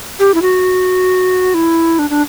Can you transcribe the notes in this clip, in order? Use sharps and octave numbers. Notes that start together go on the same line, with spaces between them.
G4
E4
F#4
E4
D4
D4